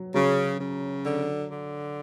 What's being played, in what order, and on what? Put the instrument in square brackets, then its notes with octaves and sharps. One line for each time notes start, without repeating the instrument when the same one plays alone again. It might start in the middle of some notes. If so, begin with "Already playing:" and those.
Already playing: [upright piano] F#3
[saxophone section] C#3 [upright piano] F#3
[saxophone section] C#3
D3
D3